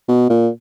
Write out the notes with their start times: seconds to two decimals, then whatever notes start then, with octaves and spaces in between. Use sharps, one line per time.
0.08 B2
0.29 A#2